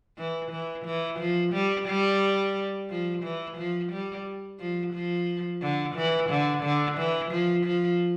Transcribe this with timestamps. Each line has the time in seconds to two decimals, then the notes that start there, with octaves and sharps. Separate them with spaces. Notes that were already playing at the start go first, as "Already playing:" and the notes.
0.18 E3
0.52 E3
0.86 E3
1.20 F3
1.54 G3
1.88 G3
2.90 F3
3.24 E3
3.58 F3
3.92 G3
4.60 F3
4.94 F3
5.62 D3
5.96 E3
6.30 D3
6.64 D3
6.98 E3
7.31 F3
7.66 F3